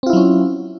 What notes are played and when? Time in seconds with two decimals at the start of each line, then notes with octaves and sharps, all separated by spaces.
0.03 C4
0.06 F4
0.10 E4
0.13 F#3
0.17 C#4